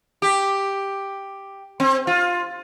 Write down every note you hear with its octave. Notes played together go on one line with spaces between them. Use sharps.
G4
C4
F4